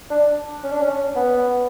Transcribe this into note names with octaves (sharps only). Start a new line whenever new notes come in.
D4
C#4
D4
C#4
B3